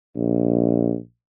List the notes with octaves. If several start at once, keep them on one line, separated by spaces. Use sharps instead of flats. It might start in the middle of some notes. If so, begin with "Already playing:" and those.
A#1